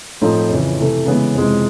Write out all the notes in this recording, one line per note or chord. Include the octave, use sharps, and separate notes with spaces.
A2 F3 A3 C4 D#4
F2 C#3 E3
C3 E3 A3
C#3 E3 G#3 B3
F2 C3 E3 G#3